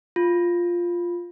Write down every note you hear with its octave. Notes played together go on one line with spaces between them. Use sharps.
F4